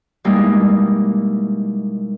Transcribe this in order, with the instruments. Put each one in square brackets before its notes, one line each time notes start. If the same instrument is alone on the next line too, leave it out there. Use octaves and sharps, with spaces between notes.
[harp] B2 G3 G#3 A#3 D#4 E4